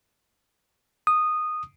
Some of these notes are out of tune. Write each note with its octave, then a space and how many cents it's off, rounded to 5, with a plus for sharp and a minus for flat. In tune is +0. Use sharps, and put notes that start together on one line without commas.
D#6 -10